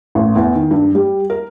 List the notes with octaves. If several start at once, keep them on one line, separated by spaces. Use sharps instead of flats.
A1
E2
D#3
G2
G3
A#4